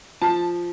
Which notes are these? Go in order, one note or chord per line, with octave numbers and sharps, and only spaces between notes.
F3 A5